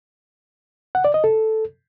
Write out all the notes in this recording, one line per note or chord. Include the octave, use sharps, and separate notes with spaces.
F#5
D5
D#5
A4